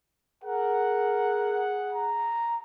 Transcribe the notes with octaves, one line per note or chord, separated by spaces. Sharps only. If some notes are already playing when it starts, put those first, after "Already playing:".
G#4 A#4 F#5
A#5